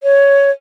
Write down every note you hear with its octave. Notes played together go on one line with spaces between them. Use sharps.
C#5